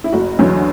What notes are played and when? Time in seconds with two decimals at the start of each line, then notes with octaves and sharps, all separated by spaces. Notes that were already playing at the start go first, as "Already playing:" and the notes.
0.04 E4
0.12 F#1 F#4
0.39 E2 D3 F#3